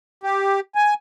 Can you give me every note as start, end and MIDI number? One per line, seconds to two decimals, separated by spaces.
0.23 0.60 67
0.75 0.94 80